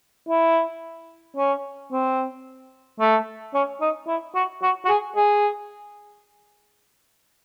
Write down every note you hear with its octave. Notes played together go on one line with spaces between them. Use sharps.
E4
C#4
C4
A3
C#4
D#4
E4
F#4
F#4
F#4
G#4
G#4